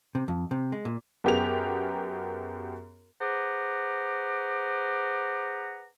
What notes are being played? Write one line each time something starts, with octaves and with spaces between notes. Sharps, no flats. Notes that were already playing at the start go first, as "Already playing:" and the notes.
C3
F2
C3
G#3
A#2
F#2 B3 G4 G#4 A#4 F7
G#4 B4 C5 F#5 A#5 D6